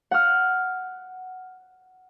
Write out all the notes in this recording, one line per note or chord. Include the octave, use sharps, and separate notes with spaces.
F#5 F6